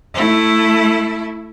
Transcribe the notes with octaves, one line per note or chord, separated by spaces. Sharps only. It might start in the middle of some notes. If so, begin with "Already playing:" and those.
A3 E4